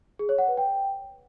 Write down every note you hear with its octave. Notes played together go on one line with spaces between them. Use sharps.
G#4
C#5
F#5
B4
G5